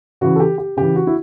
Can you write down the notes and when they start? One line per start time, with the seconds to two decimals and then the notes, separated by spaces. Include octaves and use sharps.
0.21 C#3 E3 F#4
0.36 A4
0.40 G4
0.58 G4
0.77 C#3 E3 G4
0.96 F#4
1.07 E4